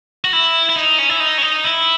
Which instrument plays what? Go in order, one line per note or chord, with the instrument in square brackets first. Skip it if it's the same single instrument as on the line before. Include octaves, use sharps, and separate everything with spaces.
[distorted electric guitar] F#4
E4
E4
D#4
C#4
E4
D#4
C#4
D#4
E4